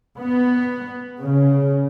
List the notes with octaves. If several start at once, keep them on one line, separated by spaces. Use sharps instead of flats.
B3
C#3